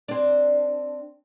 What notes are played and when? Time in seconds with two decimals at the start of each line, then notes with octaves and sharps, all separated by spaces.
0.08 C4 D4